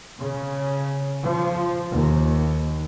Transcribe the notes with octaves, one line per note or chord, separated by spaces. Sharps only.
C#3
F3
D#2